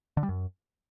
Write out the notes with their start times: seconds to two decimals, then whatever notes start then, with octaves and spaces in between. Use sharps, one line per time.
0.17 D3
0.23 G3
0.29 F#2